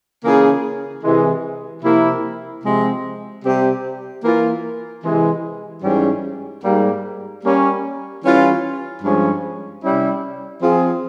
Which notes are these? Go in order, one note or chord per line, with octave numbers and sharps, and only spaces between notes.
C#3 E3 A#3 F4 G#4
C3 E3 G#3
C3 F3 A#3 E4
C3 F3 G#3 C4
C3 G3 C4 G4
E3 A#3 F4 A#4
C3 E3 G#3
G#2 E3 G3 C#4
G#2 G3 A#3
G3 A#3 C#4
E3 G3 C#4 F4
G2 F3 G#3 C#4
C3 G3 C#4 E4
F3 C4 F4 G#4